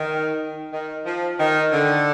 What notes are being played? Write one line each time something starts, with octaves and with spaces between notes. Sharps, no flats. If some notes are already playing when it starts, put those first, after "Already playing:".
Already playing: D#3
D#3
F3
D#3
D3